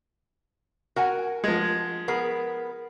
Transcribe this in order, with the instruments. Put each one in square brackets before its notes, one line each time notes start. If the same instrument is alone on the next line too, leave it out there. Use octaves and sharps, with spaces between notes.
[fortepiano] F#4 [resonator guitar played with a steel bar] A#4 F#5 G#5
[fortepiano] F3 G#3
[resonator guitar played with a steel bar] B3 G#4 A#4